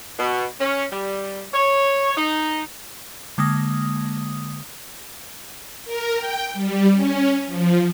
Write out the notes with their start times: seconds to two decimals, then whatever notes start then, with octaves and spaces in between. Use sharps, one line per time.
0.19 B2
0.59 C#4
0.91 G3
1.53 C#5
2.17 D#4
3.38 D3 G#3 A#3 D#6
5.85 A#4
6.16 G5
6.53 G3
6.91 C#4
7.46 F3